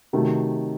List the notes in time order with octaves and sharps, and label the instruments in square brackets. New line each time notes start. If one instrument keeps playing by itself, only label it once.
[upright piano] C3 D#3 F#3 A3